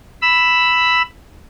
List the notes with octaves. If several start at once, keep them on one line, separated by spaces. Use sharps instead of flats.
B5 E6